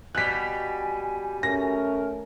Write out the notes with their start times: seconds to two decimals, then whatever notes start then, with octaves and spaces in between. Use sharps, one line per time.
0.15 B2 G3 G#5 F#6 B6
1.43 A3 C#4 A#4 A#6